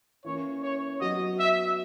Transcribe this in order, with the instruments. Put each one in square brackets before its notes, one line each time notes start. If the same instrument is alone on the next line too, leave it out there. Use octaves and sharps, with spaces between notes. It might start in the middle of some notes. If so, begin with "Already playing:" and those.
[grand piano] E3 A#3 C#4 E4 [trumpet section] C#5
[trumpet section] C#5
[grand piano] F#3 B3 F#4 [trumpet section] D#5
[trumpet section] E5